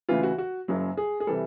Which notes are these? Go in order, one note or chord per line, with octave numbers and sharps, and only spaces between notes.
D2 C#3 E3 F4
F#4
F#4
F#1 F#2 C#3 F#3
G#4
G#4
C3 E3 G3 A4